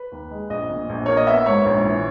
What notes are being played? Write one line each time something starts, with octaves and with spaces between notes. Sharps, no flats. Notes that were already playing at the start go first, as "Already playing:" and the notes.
Already playing: B4
D#2
G#3
A#1 D#5
A#2
A#1
A#3 C#5
D#5
B3 E5
G#2 C#5
A#1
E3